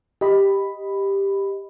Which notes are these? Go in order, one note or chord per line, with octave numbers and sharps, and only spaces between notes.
G4 D#5 B5